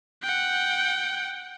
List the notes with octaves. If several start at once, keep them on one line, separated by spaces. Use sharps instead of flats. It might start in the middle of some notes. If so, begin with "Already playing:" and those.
F#5 G5